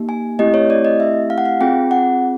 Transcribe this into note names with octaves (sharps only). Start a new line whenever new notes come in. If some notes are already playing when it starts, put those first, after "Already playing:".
Already playing: A#3 D#4 G4
G#5
A3 C4 E4 G4 D#5
C#5
D5
D#5
E5
F5
F#5
F5
C4 F4 G#4 G5
F#5